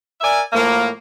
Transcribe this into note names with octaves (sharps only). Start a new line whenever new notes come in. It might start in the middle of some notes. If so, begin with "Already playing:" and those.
A#4 D5 E5 G#5
A2 F3 A#3